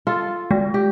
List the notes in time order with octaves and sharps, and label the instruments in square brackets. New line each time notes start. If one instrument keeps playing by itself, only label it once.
[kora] F4 A4
[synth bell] G#3
[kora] G4